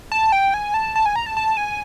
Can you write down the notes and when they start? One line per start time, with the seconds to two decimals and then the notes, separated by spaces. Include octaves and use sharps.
0.12 A5
0.32 G5
0.54 G#5
0.74 A5
0.96 A5
1.06 G#5
1.16 A#5
1.26 A5
1.37 A5
1.57 G#5